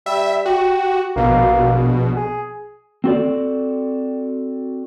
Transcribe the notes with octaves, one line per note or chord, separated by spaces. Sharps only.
G3 E5
F#4 G4
A#1 B2 A#3
G#4
C4 F#4 A4 D5